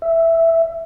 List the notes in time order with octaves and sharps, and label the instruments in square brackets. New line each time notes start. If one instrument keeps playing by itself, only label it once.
[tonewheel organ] E5